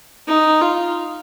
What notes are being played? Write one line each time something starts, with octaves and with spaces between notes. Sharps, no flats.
D#4
F4